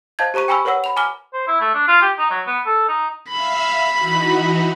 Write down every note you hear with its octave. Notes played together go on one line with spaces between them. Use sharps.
C5 D#5 F5 A5 G6 G#6
G4 C5 A#5 C#6 D#7
G5 G#5 A#5 B5 C#6 E6
A#4 B4 C#5 F#5 E6
B5 F7
G#5 A#5 D6 F6 G7
C5
E4
A3
D4
F4
G4
D#4
F#3
B3
A4
D#4
E5 F5 B5 E6
E3 D#4 F#4